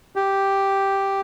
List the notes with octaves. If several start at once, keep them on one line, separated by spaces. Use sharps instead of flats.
G4